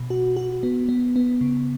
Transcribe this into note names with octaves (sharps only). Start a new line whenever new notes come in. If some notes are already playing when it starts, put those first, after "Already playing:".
Already playing: B2
F#4
F#4
B3
B3
B3
C#3